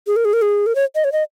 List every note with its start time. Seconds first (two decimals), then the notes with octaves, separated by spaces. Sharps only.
0.07 G#4
0.16 A#4
0.25 G#4
0.33 A#4
0.42 G#4
0.66 A#4
0.75 C#5
0.95 D#5
1.04 C#5
1.12 D#5